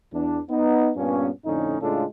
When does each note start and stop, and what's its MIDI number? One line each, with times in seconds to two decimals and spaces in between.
0.13 0.39 40
0.13 0.39 62
0.50 0.90 59
0.50 0.90 63
0.96 1.28 43
0.96 1.28 46
0.96 1.28 59
0.96 1.28 61
1.46 1.77 41
1.46 1.77 45
1.46 1.77 50
1.46 1.77 61
1.46 1.77 63
1.82 2.04 45
1.82 2.04 49
1.82 2.04 56
1.82 2.04 62
1.82 2.04 65
1.82 2.04 69